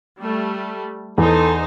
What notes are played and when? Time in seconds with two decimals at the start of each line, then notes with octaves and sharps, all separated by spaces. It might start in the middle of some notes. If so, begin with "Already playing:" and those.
0.20 G3 A3
1.18 E2 D#4 A4 C5